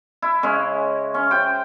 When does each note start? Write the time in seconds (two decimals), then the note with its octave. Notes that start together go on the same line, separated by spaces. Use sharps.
0.22 E4
0.43 C#3 G#3 C#4
1.14 C#4
1.31 C5 G5